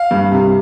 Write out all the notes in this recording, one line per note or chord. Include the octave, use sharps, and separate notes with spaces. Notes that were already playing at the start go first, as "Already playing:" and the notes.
Already playing: F5
G2
C3